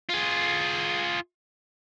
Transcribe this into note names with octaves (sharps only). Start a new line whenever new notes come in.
F4 G#4